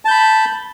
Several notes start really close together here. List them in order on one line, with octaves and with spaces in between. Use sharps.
A5 G6 B5